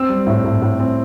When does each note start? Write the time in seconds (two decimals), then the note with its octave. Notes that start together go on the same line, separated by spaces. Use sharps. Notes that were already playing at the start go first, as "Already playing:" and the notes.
Already playing: C4 E6
0.09 G3
0.27 A2
0.45 A2
0.62 A2
0.80 C4